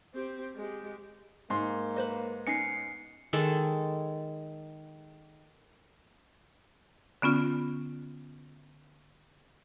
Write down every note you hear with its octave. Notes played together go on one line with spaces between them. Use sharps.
C4 G4
G#3 G4
G#2 A#3 C6
B4 C5 D#5
B3 C#4 D#4 C7 C#7
D#3 G#3 A4
D3 B3 C#4 F4